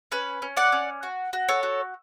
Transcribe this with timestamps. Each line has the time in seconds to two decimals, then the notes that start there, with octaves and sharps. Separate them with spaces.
0.12 C#4 B4
0.42 C#4
0.57 D5 F#5
0.72 C#4
1.03 F#4
1.33 F#4
1.49 A4 C#5
1.63 F#4